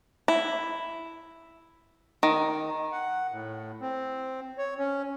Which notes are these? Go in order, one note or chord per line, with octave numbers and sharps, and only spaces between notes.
E4
D#3
F#5
A2
C4
C#5
C#4